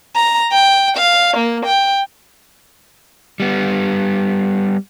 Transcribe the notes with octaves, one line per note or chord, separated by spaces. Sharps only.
A#5
G5
F5
A#3
G5
G3 B3